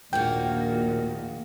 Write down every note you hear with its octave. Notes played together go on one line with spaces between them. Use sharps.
A#1 D#2 A#2 A#3 F4 F#4 G5